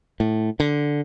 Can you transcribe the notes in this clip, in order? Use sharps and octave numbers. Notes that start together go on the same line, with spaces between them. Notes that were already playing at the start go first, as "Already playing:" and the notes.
A2
D3